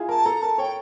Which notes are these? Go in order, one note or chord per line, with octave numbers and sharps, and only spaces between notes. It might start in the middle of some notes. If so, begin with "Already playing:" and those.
Already playing: E4 F4 G#4
A#4 A5
A4 A#5
A#4 A5
C#5 G5